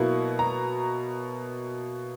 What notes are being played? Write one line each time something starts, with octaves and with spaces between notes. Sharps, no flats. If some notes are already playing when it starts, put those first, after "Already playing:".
Already playing: B2 F#3 A#3 E4
A#5